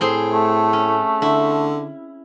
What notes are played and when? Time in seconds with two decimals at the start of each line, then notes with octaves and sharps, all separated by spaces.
0.01 A2 C4 G#4 C5
0.32 A3
0.73 C#4
1.22 D3 E4